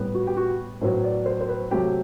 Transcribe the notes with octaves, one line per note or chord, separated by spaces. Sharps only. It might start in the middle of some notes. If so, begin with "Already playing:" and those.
Already playing: A2 G3 B3
F#4
G4
F#4
A2 F#3 B3 C5
D5
C5
C5
B4
C3 F#3 A3 C4 G4